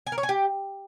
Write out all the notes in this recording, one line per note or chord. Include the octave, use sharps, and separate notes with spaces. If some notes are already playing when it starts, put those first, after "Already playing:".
G#5
A#4
C#5
G#5
G4